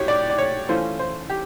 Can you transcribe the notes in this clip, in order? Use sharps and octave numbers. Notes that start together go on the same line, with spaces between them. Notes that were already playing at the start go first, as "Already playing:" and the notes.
Already playing: A2 F#4 G4 C#5
D5
D5
C#5
E3 A3 C#4 F4 C5
C5
G4